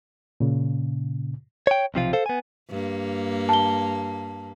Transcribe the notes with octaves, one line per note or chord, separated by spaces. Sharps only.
A#2 C#3
C#5 G5
B1 C3 F3 F4
A4 C5 F5
B3 G#5
G2 A#3
A5 G7